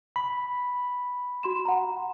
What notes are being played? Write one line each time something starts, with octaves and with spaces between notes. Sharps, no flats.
B5
F#4 C6 E7
F#5 A#5